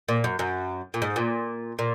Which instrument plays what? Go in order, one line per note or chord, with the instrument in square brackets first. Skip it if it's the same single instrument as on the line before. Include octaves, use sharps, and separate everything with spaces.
[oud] A#2
F#2
F#2
A#2
G#2
A#2
A#2